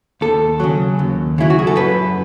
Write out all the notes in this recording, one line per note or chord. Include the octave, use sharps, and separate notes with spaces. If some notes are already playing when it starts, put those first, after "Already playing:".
D#2 A4
C#3 F#3
D#2
C#3 F#3 E4
F#4
G#4
A4
F#2 B4